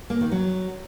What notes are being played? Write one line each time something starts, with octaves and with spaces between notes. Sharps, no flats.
A#3
D#3
F#3